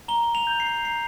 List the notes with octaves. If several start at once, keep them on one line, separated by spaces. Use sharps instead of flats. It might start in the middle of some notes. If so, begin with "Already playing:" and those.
A#5 G7
F7
G6
C7
A#5 C7